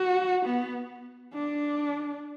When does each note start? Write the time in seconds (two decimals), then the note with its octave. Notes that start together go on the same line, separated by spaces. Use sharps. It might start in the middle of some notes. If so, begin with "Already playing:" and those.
Already playing: F#4
0.46 B3
1.35 D4